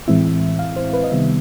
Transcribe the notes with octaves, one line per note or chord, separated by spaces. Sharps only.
A2 E3 G#3 C4 E4 E5
F5
C5
B4
D#5
C3 D#3 G3 B3 E5